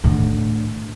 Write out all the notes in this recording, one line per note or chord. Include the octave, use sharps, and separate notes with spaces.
A2 D3